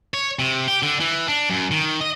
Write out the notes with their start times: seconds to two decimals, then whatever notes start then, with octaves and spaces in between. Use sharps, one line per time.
0.14 C#5
0.39 C3
0.68 G4
0.83 D3
1.00 E3
1.28 D4
1.50 F#2
1.71 D#3
2.01 D#5